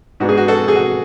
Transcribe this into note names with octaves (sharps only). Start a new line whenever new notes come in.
G#2 G#3 B3 D4 F#4
G#4
F#4
F#4 A4
G#4
F#4